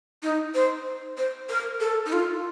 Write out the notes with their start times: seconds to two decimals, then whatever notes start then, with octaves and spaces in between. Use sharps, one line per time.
0.23 D#4
0.55 C5
1.18 C5
1.49 A#4
1.81 A4
2.06 D#4
2.13 F4